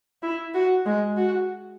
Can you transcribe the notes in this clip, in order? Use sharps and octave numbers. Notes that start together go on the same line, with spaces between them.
E4
F#4
G#3
F#4